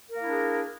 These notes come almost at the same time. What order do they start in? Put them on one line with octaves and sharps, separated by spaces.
A#4 A#3 E4 D4 G#4